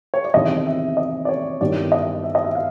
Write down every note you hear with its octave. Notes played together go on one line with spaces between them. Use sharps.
C#5
D5
E2 C3 D#3 D#5
E5
D#5
D5
C#5
G2 D#3 G3 B3 E4 D5
D#5
E5
D#5
E5
F5